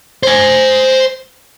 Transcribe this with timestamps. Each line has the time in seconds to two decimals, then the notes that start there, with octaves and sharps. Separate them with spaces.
0.23 C5 G#5